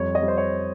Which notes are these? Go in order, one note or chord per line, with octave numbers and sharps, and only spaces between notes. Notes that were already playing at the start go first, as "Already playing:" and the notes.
Already playing: F2 G3 C#5
D#5
G3
C5
C#5